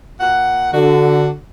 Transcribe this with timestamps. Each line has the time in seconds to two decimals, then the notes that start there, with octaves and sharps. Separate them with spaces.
0.20 A#2 F#5
0.74 D3 D4 F#4